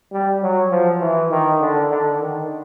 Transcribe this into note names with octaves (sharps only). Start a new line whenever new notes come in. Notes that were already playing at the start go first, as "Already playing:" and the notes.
G3
F#3
F3
E3
D#3
D3
D3
D#3